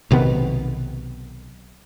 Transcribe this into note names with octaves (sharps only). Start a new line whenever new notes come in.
B1 C3 D#3 B3